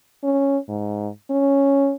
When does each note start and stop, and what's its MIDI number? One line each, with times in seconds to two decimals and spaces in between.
0.23 0.58 61
0.69 1.09 44
1.30 1.94 61